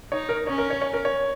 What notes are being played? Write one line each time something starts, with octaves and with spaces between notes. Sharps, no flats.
D#4 C#5
A#4
C#4 C#5
A#4
C#5
C#5
A#4
C#5